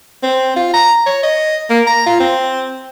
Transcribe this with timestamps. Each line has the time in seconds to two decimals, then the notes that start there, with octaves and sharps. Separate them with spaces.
0.23 C4
0.56 F4
0.74 A#5
1.06 C#5
1.23 D#5
1.70 A#3
1.87 A#5
2.06 F4
2.20 C4